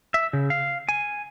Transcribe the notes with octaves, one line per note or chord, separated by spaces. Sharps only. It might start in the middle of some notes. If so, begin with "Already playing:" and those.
E5
C#3
F5
G#5